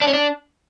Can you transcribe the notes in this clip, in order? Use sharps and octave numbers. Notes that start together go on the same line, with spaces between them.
D4
C#4
D4